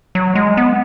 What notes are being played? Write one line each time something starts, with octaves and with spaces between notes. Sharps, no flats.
F#3
G#3
B3